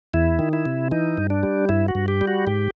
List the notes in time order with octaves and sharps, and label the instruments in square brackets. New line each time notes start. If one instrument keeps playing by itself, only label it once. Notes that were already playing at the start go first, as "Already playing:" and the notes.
[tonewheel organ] E2 E4
D#3
E4
C3
E3 D#4
G2
D4
G3
G2 E4
F#4
G2
G4
G3
F#4
G#2 G4